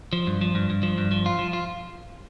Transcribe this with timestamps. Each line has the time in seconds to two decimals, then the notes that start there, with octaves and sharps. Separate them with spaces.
0.13 F3
0.27 G2
0.41 F3
0.55 G2
0.70 G2
0.83 F3
0.98 G2
1.11 F3
1.26 F4
1.39 F3
1.53 F4